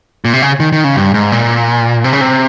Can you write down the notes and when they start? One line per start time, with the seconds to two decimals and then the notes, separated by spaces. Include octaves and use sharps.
0.25 A#2
0.33 C3
0.42 C#3
0.60 D#3
0.72 D#3
0.84 C#3
0.96 G2
1.14 G#2
1.32 A#2
2.04 C3
2.13 C#3
2.21 C3